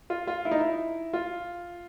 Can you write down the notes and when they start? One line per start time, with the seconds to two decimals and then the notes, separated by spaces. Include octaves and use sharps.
0.10 F4
0.27 F4
0.45 E4
0.51 D#4
0.59 E4
1.13 F4